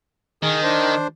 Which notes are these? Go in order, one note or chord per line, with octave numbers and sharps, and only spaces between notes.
D#3 G#4
D4 C5